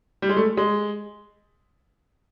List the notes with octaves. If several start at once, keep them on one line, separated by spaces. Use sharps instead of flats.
G3
G#3
A3
G#3